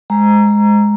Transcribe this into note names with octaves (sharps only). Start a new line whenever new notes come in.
G#3 A#5
G#3